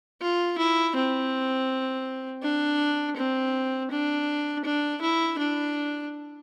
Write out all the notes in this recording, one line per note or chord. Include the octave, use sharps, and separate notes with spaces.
F4
E4
C4
D4
C4
D4
D4
E4
D4